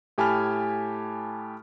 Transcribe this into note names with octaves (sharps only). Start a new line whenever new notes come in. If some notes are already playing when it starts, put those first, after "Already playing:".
A2 G4 G#5 A5 B5 F6